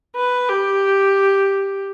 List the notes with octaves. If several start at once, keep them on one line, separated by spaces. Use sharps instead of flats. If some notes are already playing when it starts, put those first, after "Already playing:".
B4
G4